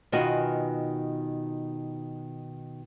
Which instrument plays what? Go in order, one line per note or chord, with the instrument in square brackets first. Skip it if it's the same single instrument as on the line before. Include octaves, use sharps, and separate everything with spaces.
[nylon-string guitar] B2 D#3 F4 F#4 B4 G#5